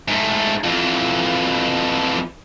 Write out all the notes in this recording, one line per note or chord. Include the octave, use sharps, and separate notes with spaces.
G#2 A3
F2 E3